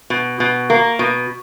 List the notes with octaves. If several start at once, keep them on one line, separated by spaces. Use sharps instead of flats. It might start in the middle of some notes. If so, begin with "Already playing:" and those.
B2
B2
A#3
B2